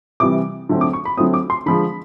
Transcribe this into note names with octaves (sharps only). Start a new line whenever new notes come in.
C3 E3 G3 D6
D3 F#3 A3 C4
D6
C#6
B5
D3 F#3 A3 C4 D#6
D6
C6
D3 F3 G#3 B5